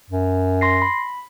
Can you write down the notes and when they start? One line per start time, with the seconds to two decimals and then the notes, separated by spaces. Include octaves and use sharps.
0.10 F#2
0.61 C6 A#6 C7
0.82 B5